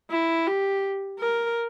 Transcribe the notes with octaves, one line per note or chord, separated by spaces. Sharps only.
E4
G4
A#4